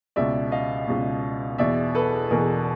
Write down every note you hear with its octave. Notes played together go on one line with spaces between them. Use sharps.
C#2 B2 D5 E5
D#5 F5
C#2 B2
E2 B2 D5 E5
A4 B4
E2 B2 G#4 A#4